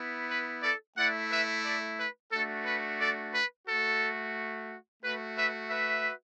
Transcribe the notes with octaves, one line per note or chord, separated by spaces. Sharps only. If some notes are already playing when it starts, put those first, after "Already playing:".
Already playing: B3 E4
B4
A4 D5
A3 E4 D5 F#5
B4 E5
A4 D5
B4
A3 D4 F#4 A4
B4
A4 D5
B4
A3 F#4 A4
A3 F#4 B4
B4 E5
B4 E5